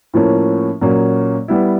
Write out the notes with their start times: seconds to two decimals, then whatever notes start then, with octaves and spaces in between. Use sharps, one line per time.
0.14 A2 F3 A#3 C#4
0.81 A#2 F#3 A#3 C#4
1.48 G3 B3 E4